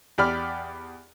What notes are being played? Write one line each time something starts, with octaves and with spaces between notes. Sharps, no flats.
E2 G4 D5 B5 F6